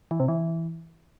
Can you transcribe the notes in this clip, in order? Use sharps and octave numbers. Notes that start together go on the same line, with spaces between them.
E3
C3
E3